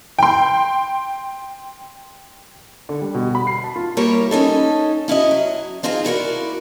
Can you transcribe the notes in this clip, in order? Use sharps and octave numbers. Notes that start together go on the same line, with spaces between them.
G5 C6
D3
G3
B2
B5
C7
A5
F4
G3 A#3 E4 A#4 C#5
C#4 D#4 A4
C#4 E4 F#4 D#5
F#3
C4 D#4 F4 G#4 C5
E4 F#4 A#4 D5